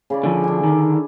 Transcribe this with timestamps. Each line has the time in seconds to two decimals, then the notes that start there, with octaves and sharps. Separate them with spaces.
0.10 C#3 E4 D5
0.24 D3 F3
0.44 D4 G#5
0.64 D3 D#3